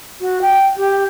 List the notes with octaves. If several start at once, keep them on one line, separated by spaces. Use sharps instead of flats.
F#4
G5
G4